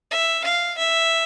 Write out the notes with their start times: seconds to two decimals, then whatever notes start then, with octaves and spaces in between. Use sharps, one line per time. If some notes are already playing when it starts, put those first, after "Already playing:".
0.11 E5
0.44 F5
0.78 E5